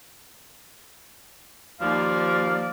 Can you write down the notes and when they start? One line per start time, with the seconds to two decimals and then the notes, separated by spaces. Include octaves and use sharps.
1.81 D#2 F3 A#3 D5 F5